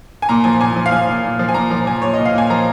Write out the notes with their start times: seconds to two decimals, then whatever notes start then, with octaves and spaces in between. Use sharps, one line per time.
0.22 G#5
0.29 A#2 A#5
0.44 F3 G#5
0.61 A#2 G#5
0.76 F3
0.86 F5
0.91 F3 G#5
1.08 A#2
1.24 A#2
1.39 F3
1.49 G#5
1.54 A#2 A#5
1.70 F3 A#5
1.87 F3 G#5
2.02 A#2 C#5
2.13 A#2 D#5
2.25 F5
2.34 A#2 G#5
2.50 F3 A#5